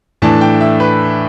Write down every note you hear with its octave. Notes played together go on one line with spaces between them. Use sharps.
A2 E3 A3 D4 A5
G5
E5
B4